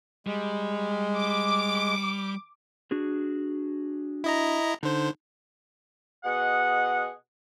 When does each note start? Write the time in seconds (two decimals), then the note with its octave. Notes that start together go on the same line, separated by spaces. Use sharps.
0.27 G3 G#3
1.16 D6
2.91 D4 F#4 G#4
4.24 E4 D#5 A#5
4.83 D3 D#4 C5
6.25 B2 G#4 D#5 F#5